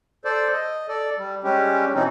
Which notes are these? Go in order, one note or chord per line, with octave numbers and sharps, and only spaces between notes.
A4 C5 D5
D#5
A4 D5
G3
G3 G#3 C#4 G4
B2 E3 C4 C#4 D#4